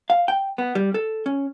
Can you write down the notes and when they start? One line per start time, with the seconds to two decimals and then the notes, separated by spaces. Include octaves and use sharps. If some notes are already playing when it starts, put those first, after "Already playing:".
0.10 F5
0.28 G5
0.58 B3
0.75 G3
0.94 A4
1.26 C#4